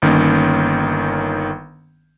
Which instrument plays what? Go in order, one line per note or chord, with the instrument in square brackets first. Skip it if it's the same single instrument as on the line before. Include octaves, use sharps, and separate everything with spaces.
[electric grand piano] G1 D#3 A#3 C#4